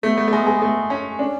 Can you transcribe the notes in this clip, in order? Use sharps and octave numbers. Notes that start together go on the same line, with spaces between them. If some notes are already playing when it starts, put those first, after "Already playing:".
A3 B3
A3
A3
G#3
G#3
A3
C#4
C#4 D4